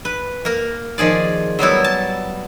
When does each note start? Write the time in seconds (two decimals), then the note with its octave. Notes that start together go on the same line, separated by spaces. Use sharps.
0.05 B4
0.45 A#3 A#4
0.98 D#3 F3 G#4 D5
1.59 F#3 G3 B3 E4
1.84 A5